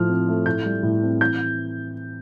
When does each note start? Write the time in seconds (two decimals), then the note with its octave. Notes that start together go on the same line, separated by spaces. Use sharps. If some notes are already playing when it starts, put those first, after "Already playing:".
Already playing: A2 F3 F6
0.09 C4
0.28 A3
0.46 A2 G6
0.65 G3
0.83 A2
1.03 C4
1.21 E3 G6